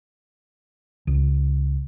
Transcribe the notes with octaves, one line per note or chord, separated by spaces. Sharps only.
C#2